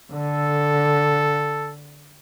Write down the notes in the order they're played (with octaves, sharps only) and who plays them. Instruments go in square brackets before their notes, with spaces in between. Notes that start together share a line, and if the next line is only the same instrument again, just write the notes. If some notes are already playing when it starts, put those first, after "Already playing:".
[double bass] D3 [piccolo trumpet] A4